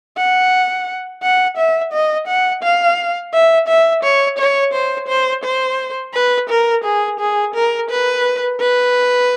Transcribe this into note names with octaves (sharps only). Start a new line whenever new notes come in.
F#5
F#5
E5
D#5
F#5
F5
E5
E5
C#5
C#5
C5
C5
C5
B4
A#4
G#4
G#4
A#4
B4
B4